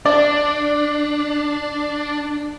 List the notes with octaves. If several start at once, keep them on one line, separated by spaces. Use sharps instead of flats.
D4 D5